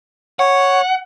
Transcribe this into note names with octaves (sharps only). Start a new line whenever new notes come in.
C#5 F#5